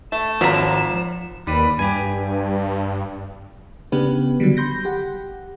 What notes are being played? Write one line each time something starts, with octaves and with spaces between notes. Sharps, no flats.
A3 E7
G#1 F3 F#3 A#5 B6
D#2 G3 B4
G2 G4 G#5
C#3 B3 D4 G4 B4
D3 F#3 G3
B5 C6 G6 A#6
G4 F#5